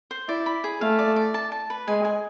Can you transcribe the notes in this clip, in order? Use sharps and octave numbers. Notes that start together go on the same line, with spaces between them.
C5
E4 D5
B5
G#4
A3 F5
D5
D5
A5
A5
B4
G#3 G#5
G#5